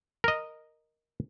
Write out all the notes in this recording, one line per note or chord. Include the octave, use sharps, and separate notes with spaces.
A#4 D#5